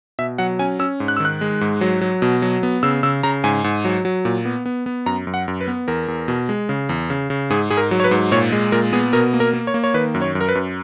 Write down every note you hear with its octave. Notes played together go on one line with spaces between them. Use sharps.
B2 E5
F#3 F#5
C#4 G#5
C#4 E6
G#2
F#6
E6
D#3 F#6
G#3
G#2
F#3
F#3
B2
F#3
B3
C#3 E6
C#3 E6
C#3 A#5
G#2 G#5
G#2
F#3
F#3
A#2
B3
B3
B3
F#2 A#5
F#2
F#5
F#2
B4
B3
E2 A#4
E2
B2
G#3
C#3
E2
C#3
C#3
G#2 G#4
G#2 G#4
A#4
F#3
C#5
B4
G#2
A#2 C#5
G#3
A#2 A#4
B3 G#4
B2 A#4
A#3
A#4
A#3
C#5
A#3
C#5
D#3 B4
F#2
C#5
F#2
A#4
B4
F#2